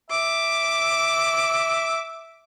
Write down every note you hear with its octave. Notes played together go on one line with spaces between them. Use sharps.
E5 D6